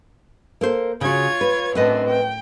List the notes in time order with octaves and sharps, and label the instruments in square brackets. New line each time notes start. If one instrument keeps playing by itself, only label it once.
[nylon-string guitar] A#3 A4 C5
[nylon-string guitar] C#3 F#4 [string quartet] F4 C#5 G#6
[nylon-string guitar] B4
[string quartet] F#2 A2 D4 [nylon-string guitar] C4 B4 D#5
[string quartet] G5